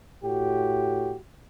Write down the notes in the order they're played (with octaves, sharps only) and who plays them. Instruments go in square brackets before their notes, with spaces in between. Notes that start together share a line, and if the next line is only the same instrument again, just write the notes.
[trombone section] A2 F#4 G4